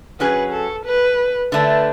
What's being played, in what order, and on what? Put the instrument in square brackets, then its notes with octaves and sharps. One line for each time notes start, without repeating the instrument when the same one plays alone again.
[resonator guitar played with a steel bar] F#3 C#4 G#4 [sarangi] B4
[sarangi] A4
B4
[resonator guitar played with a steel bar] D3 A3 D4 [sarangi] B4